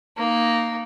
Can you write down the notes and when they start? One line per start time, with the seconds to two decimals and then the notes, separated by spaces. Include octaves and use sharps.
0.17 A#3 D#4